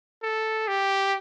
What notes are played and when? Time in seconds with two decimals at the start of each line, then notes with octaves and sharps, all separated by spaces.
0.23 A4
0.68 G4